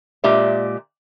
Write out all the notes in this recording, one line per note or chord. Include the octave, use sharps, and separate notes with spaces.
A#2 G#3 G4 D5 E5